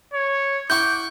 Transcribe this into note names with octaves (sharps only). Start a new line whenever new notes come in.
C#5
E4 F#5 C#6 D6 G6